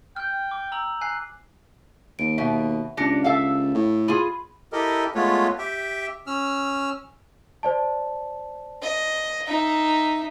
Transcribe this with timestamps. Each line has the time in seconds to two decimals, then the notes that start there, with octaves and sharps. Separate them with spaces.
0.16 G5 F6 G6
0.51 D6
0.72 A#5 E6 F#7
1.01 G#5 F#6 C7
2.19 D#2 D7
2.38 B2 E5
2.97 C#2 D4 G4 A#6 C#7
3.24 A4 E5 F5
3.75 A2
4.08 F4 G#4 B5
4.73 E4 G4 A4 A#4 D#5
5.15 G#3 A3 B3 F4 B4 C#5
5.58 G4 E5 G5
6.27 C#4 E6 F6
7.63 C5 D5 A5
8.82 D#5
9.47 D#4 E5